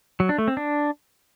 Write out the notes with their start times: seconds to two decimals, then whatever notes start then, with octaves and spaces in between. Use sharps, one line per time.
0.20 F#3
0.29 D4
0.38 A3
0.48 C4
0.57 D4